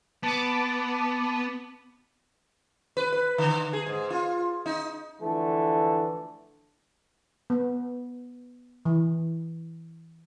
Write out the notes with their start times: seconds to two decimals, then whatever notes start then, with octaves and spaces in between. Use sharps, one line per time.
0.23 B3 A5 D6
2.97 B4
3.12 B4
3.38 D3
3.73 G#4
3.86 G#2
4.10 F4
4.66 D#4
5.21 D3 E3 F3 A3
7.50 B3
8.85 E3